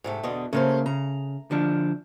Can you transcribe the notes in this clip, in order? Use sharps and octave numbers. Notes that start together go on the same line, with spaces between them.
G#2 C3 A3
E2 B2 D3
C#3 A3 A#3 C#4 C5
C#3 A#5
D3 F3 D4